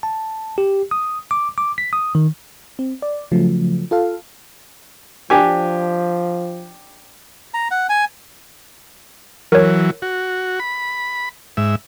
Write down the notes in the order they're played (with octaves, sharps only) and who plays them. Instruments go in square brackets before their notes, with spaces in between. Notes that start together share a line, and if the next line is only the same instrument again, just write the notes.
[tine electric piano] A5
G4
D#6
D6
D6
B6
D#6
D#3
[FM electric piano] C4
D5
C#3 F3 F#3 A3
F4 A4 F5
[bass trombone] F3 [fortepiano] D4 G4 G#5
[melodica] A#5
F#5
G#5
[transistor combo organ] E3 F#3 [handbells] A#4 C#5
[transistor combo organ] F#4
B5
G#2 E5